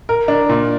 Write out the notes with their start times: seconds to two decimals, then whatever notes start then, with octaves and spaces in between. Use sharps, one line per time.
0.09 A#4
0.28 D4
0.49 A#2